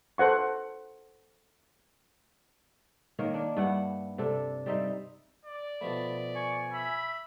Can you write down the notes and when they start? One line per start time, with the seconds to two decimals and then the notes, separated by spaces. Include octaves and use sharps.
0.18 A4 C5 F#5 C#6
3.19 D#3 A#3 A#4 C#5
3.34 D4
3.57 G2 E4 F#5
4.18 C3 D4 A4
4.66 G3 C4 D#4 E5
5.46 D5
5.81 B2 F3 A3 B5
6.35 G#5 C#6
6.73 E5 B5